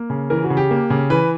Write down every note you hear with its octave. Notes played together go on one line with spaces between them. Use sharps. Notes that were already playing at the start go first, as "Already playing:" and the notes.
Already playing: A#3
C#3
E3 A#4
F#4
C#3
G4
A#3
C#3
E3 B4